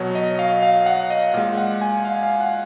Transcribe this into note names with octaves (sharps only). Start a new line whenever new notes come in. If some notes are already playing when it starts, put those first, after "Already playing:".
Already playing: B2 F#3 C#5
D#5
F5
F5
F#5
D#5
A#2 G#3 F5
F#5
G#5
F5
F5
F#5